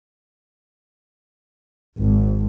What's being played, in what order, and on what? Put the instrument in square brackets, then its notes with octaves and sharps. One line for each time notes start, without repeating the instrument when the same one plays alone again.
[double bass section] G#1